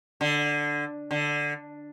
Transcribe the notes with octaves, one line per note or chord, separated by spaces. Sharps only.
D3
D3